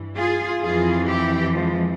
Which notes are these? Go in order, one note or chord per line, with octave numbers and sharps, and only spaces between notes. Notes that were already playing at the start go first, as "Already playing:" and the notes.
Already playing: G2 E3
F4 G#4
F2 E3 F4 G#4
E4 G4
F3 G#3